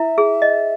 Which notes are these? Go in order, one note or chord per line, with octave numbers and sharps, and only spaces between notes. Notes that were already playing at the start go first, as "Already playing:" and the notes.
Already playing: E4 E5
G#4
D#5